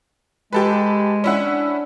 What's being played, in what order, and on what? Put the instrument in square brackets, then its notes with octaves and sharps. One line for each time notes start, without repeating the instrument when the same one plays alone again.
[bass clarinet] G#3 [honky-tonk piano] G4 A4 B4
[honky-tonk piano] C#4 E4 F#5 [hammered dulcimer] D4